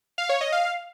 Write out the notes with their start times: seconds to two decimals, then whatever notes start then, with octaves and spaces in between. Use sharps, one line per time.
0.18 F5
0.29 C#5
0.41 D#5
0.52 F5